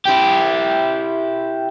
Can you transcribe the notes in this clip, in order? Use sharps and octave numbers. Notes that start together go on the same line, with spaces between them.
E4 G4